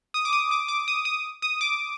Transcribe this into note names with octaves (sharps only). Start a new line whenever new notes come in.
D#6
D6
D#6
D6
D6
D#6
D#6
D#6
D6